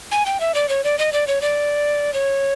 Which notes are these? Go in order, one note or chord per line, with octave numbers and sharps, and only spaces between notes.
G#5
G5
E5
D5
C#5
D5
D#5
D5
C#5
D5
C#5